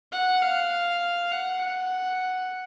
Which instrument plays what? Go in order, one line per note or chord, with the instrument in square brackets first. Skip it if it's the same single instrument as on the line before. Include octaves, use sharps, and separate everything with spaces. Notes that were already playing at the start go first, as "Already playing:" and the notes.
[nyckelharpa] F#5
F5
F#5
F#5